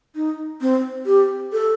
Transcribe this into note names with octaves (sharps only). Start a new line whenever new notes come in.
D#4
C4
G4
A4